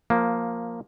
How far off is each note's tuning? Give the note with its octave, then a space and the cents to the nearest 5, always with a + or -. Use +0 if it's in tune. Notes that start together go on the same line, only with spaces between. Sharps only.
F3 +15 A#3 +0